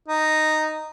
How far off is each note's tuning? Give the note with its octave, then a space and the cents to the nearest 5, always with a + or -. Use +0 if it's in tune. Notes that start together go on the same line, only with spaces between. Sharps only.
D#4 -5